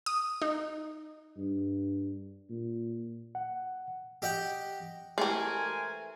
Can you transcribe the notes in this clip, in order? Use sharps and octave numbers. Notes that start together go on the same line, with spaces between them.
D#6
D#4
G2
A#2
F#5
G4 D#5 F#5 G5
E3 G#3 A3 G4 A#4 C5 G#5